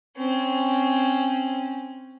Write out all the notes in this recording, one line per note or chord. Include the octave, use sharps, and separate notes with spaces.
C4 C#4